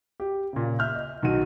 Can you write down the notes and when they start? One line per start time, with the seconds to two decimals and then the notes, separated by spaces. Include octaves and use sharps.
0.20 G4
0.53 A#2 C#3
0.79 E5 F6 G6
0.95 D#5
1.23 B1 D#3 F#4 D#7